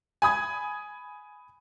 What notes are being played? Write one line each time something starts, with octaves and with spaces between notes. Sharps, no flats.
G#5 B5 D#6 G#6